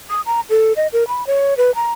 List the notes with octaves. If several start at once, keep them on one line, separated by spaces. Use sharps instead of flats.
D#6
A#5
A4
D#5
A#4
B5
C#5
B4
A#5